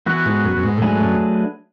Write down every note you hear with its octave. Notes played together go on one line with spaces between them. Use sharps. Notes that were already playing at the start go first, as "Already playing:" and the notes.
E3 B3 F#4 B4
G#2
F#2
F#2
G#2
A2
G#2 F#3 A3 D4 G#4 B4
F#2